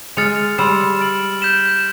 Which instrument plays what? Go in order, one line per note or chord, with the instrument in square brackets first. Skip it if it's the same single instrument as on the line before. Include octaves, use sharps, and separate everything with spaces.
[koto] G#3 [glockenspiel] F6 A6 C#7 F7
[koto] G3 [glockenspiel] C6 E6 A6 C7 E7
[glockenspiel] F6 A6 D7 F#7
G6 B6 E7 G7